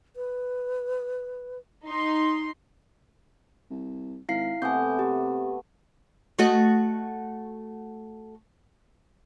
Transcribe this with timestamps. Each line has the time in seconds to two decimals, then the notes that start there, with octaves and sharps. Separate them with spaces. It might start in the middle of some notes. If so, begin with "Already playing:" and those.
0.16 B4
1.85 D#4 C6
3.70 C2
4.29 G#1 E4 F5 C7
4.62 C3 A3 B3 G#5 D6 G6
4.99 G4
6.39 A3 F#4 D#5